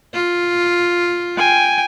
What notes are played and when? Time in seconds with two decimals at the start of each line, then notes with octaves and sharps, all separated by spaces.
0.14 F4
1.38 G5 G#5